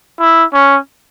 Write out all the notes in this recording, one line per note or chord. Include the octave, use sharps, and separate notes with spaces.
E4
C#4